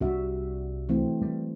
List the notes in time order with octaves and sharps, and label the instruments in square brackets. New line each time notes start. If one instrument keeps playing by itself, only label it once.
[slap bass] C2 F3 D4 [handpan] G3 F#4 E5
[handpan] E3 A3 C4
[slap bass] G3